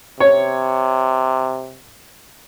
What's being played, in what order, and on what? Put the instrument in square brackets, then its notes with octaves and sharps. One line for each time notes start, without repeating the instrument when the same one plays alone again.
[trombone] C3 [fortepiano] C#5